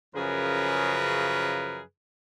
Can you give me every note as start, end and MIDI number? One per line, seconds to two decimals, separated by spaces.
0.15 1.82 42
0.15 1.82 49
0.15 1.82 53
0.15 1.82 68
0.15 1.82 70
0.15 1.82 71